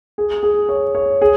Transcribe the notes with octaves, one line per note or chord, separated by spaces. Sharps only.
G#4
G#4
C#5
C#5
G#4